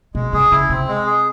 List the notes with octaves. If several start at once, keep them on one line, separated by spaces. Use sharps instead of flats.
B2 G#3
C3 G#4
C#3 E4
C3 C4
G#3
G#4